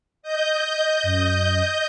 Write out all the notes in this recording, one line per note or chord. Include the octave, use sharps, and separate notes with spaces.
D#5 G6
F#2